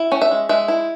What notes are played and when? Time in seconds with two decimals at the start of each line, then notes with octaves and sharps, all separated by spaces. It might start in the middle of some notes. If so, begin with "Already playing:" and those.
Already playing: E4
0.12 C#4
0.22 E5
0.31 G#3
0.49 G#3 E5
0.68 E4